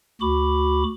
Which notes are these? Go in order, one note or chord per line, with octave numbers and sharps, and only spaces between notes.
D2 F#4 B5 D6